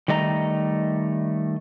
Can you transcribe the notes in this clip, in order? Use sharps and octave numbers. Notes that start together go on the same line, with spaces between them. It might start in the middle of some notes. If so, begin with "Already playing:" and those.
D#3 G3 A3 D#5 G#5 A#5